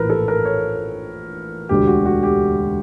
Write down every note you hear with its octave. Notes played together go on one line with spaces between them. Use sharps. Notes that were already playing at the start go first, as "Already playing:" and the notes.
Already playing: A#1 A2 E3 A#4 B4
A4
A#4
C#5
E1 D2 D3 G4
F#4
F#4
G4